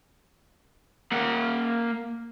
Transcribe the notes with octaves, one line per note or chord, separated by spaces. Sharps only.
A#3 F#5